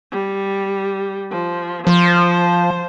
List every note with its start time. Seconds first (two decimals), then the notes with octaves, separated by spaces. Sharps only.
0.12 G3
1.31 F3
1.87 F3 C5